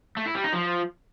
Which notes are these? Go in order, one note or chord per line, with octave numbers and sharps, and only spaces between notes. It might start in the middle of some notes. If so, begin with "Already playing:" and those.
A3
E4
G3
D#4
F3